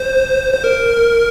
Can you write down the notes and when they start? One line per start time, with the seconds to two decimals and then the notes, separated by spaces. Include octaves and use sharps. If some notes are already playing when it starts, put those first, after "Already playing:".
Already playing: C5
0.53 C5
0.64 A#4